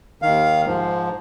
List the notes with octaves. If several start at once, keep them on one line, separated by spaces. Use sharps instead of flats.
D#2 D#3 F5
G#2 F3